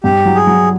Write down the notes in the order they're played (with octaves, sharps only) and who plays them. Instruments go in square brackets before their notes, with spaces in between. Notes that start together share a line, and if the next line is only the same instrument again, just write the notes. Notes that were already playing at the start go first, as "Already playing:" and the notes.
[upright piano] G2 [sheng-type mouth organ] G4
[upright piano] F#3
[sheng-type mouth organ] G#4
[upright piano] F#3